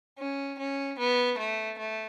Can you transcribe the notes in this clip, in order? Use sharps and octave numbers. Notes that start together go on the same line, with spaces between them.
C#4
C#4
B3
A3
A3